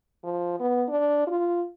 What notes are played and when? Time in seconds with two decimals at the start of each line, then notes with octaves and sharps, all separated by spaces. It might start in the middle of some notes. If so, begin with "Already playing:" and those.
0.24 F3
0.60 B3
0.88 D4
1.27 F4